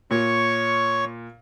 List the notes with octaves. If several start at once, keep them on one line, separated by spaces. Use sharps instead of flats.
A#2 C#5 C#6